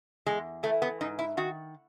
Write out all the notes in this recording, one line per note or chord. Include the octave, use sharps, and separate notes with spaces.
E2 G#3
E3 A3
B3
G#2 D#4
E4
D#3 F#4